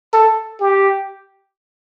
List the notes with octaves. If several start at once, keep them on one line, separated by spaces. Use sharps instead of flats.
A4
G4